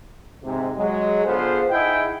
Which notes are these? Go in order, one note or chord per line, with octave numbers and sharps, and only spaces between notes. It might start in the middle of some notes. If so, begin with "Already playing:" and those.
G#2 C3
F#3 G#3
D3 B3 F4 G#4 A4 C5
D#4 E4 G#4 D#5 F#5 G5